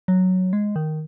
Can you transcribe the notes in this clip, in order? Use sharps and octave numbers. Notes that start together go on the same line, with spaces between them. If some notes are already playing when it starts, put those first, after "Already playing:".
F#3
G#3
D#3